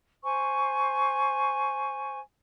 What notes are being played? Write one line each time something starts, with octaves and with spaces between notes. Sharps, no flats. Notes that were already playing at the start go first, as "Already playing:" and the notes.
C5 G#5 C#6